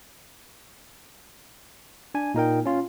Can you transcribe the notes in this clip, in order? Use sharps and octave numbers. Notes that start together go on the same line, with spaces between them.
D4 G#5
A#2 D#4 A#4 G5
C#4 F4